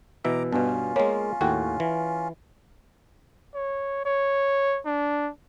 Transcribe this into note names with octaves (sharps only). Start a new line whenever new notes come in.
B2 E3 E5 A#5 D6
G2 B2 B3 C#4 F4
G#3 A#3 C#5
D#2 A2 F#4 G5
E3
C#5
C#5
D4